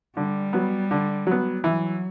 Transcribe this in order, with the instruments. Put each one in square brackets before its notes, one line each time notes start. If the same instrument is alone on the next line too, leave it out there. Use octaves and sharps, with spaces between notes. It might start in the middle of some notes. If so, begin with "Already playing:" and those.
[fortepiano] D3 [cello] G3
[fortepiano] F#3 B3
D3
F#3 B3
[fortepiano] E3 [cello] F#3